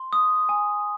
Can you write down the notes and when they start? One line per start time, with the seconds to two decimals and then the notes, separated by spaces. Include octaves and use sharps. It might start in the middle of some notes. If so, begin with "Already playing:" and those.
Already playing: C6
0.13 D#6
0.49 G#5